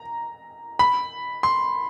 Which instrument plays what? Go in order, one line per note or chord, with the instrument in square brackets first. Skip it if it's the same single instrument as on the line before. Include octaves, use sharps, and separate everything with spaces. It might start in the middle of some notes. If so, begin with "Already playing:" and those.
Already playing: [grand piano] A#5
B5
C6